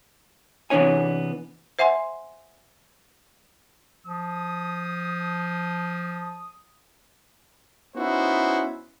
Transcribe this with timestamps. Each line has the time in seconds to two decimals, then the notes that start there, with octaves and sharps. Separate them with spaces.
0.70 C3 E3 B3 D4 C#5 G#5
1.79 C5 E5 F#5 G#5 C6
4.07 F3 D#6
7.95 B3 C#4 D#4 E4 F#4 C5